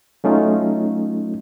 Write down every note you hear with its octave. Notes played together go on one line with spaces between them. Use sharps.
F#3 A3 C#4 D#4 F4